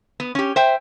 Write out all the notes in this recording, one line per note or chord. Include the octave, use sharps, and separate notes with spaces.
B3
C#4 G4
C5 E5 G5